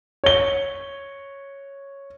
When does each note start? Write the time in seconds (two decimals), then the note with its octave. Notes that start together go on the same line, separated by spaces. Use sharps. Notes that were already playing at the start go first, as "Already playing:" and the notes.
0.24 C#5 G7